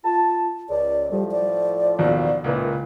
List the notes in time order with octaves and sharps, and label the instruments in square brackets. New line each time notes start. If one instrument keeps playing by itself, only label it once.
[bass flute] F4 [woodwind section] A5
[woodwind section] C#2 [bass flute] D5
[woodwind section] A2 F3 [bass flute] G3
[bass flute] D5
[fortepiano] A#1 D#2 B2
[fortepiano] C#2 A#2 B4 [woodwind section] D#3 E3 A#3